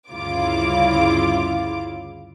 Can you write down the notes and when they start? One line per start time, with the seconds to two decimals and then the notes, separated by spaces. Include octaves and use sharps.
0.11 D2 G2 C#3 E4 F4 D6